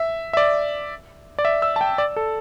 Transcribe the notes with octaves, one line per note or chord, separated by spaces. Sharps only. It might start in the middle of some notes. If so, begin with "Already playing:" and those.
Already playing: E5
E5
D5
D5
E5
E6
A5
G5
D5
A4